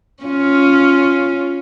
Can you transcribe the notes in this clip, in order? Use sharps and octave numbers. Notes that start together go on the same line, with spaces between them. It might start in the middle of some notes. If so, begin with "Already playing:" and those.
C#4 F4